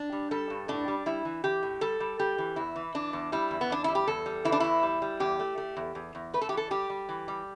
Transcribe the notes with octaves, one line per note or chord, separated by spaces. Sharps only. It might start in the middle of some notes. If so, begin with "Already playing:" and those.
Already playing: D4
G3
G3 A4
G2
A2 D4
G3
G3 E4
E3
E3 G4
A2
G3 A4
G3
G3 G4
E3
E2 E4
E3
E3 D4
E2
G3 E4
E2
B3
E2 D4
G3 E4
G4
E2 A4
G3
E3 E4
D4
E2 E4
G3
G3
E2 G4
A3
A3
E2
E2
E2
A3 B4
A4
G4
E3
A4
G3 G4
G3
E3
G3